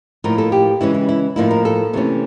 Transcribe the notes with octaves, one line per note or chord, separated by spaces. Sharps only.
A2 F3 A#3 D#4 A#4
A4
G4
C#3 E3 G#3 C#4 E4
E4
E4
A2 F3 A#3 D#4 E4
A#4
A4
C3 E3 A3 C#4